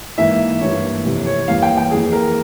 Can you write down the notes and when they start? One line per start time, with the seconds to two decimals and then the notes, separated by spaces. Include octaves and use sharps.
0.18 G#2 E3 A#3 E5
0.61 G2 E3 A#3 C#5
1.05 F2 C3 E3
1.26 C#5
1.48 E2 E3 G3 A#3 F5
1.62 G5
1.77 G5
1.91 F2 E3 A#3 G#4
2.13 A#4